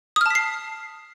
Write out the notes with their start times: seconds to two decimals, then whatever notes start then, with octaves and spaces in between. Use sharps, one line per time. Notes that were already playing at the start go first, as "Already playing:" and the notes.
0.16 D#6
0.21 F6
0.26 A5
0.30 B6
0.35 C7